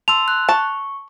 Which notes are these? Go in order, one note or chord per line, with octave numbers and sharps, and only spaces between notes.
A5 C6 E6 F7
F#6
A5 C#6